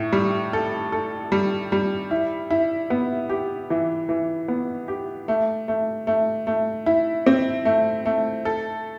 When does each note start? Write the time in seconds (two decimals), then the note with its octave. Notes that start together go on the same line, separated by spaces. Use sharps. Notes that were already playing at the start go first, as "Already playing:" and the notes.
Already playing: A2
0.13 G3
0.53 A4
0.92 A4
1.32 G3
1.72 G3
2.11 E4
2.50 E4
2.90 B3
3.29 G4
3.70 E3
4.09 E3
4.48 B3
4.88 G4
5.28 A3
5.68 A3
6.07 A3
6.47 A3
6.86 E4
7.26 C4
7.65 A3
8.06 A3
8.45 A4